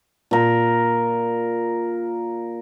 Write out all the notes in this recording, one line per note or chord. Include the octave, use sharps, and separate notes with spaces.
A#2 A#4